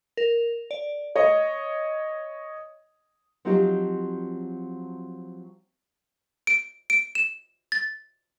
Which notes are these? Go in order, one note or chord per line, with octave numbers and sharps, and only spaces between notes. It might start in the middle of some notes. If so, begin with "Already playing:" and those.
A#4
D5
C#5 D#5
F3 F#3 C4 D#4 F4 G4
D7
D7
E7
A6